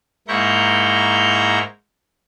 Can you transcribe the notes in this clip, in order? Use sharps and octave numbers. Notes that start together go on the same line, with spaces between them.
G#2 A#3 E4 A#5 C#6 G6